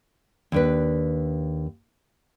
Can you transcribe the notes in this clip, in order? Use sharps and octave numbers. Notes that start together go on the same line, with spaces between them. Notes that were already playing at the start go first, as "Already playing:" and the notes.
D#2 D4 B4